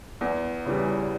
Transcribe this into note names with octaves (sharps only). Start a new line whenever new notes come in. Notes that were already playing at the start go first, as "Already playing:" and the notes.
E2
C#3 E3 G3